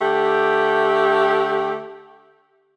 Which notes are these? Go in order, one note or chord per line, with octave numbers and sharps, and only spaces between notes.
D3 A3 G4